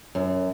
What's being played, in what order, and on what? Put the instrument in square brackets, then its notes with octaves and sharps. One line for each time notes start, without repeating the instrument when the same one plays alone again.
[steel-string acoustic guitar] F#2